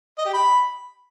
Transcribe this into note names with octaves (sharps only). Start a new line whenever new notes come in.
D#5
G4
B5